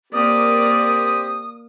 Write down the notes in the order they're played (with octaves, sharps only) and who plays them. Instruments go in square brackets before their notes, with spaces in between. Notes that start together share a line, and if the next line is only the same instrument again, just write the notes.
[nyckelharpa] A#3 [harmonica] C4 G4 [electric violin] A#4 D5 [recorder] D#6